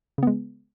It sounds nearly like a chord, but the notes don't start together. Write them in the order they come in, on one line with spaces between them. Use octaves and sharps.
C#3 B3 G#3